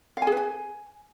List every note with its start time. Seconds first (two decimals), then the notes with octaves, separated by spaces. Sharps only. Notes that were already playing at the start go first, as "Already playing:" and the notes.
0.17 F5
0.22 G#5
0.27 G#4
0.32 B4
0.37 G#5